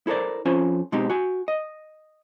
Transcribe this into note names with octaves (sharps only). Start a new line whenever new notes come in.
E4 A4 A#4 C5 D5
F2 C#4 F4 C5 G#5
B2 G#3 C4 D#4 G4
F#4 G#5
D#5